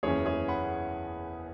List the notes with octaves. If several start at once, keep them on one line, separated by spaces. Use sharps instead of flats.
F#1 E2 E3 C#4 G#4 C#5
G#4 C#5
F#5 B5